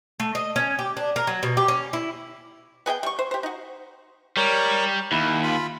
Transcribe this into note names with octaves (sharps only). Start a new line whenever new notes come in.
A3
D#5
C#4
G4
D4
A#4
F#3
B2
G4
C#4
E4
B3 G#4 D#5 G5
G3 C#6
C5
G4 C5
D#4 F#4
G3 A#4 C#5
D#2 E4
F4 B5